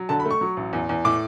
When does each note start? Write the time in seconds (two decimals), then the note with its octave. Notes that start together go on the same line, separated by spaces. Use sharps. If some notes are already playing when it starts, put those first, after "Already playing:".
Already playing: F#3
0.09 D3 A5
0.20 B5
0.25 A3
0.31 C#6
0.41 F#3
0.57 A1
0.73 E2
0.89 E2
1.05 A2 D6